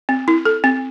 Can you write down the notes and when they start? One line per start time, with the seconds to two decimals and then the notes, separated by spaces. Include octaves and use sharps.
0.09 C4
0.28 E4
0.45 A4
0.64 C4